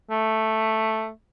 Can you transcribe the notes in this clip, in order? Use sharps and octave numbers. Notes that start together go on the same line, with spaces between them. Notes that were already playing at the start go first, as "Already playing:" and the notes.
A3